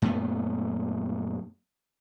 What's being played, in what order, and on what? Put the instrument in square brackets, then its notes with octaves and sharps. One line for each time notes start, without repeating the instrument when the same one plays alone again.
[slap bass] F#2 A#2 A3 B3